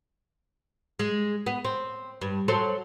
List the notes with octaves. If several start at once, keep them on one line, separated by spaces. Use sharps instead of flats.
G#3
B3
C4
G2
F#3 A4 C5